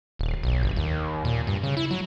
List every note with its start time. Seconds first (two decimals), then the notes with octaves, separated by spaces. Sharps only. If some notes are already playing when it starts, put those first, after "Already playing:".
0.19 D#1
0.43 B1
0.63 G1
0.76 D#2
1.25 A#2
1.47 G2
1.63 C#3
1.77 E4
1.91 F#3